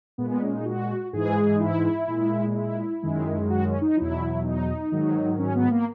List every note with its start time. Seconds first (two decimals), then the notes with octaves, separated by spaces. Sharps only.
0.18 A#2 G#3 B3
0.30 B3
0.42 C#4
0.54 D#4
0.65 F#4
1.13 G#2 E3 G#3 G#4
1.56 D#4
1.60 E4
2.08 A#2 G#3
2.55 E4
3.03 F#2 D#3 G#3
3.50 F#4
3.65 C#4
3.81 D#4
3.97 E2 B2 F#3 E4
4.44 D#4
4.92 G#2 D#3 F#3
5.39 C#4
5.55 B3
5.71 A#3